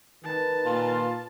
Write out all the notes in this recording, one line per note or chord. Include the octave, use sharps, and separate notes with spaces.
D#3 B4 A5
A#2 F4